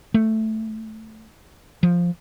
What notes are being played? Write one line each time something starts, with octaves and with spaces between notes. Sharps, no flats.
A3
F3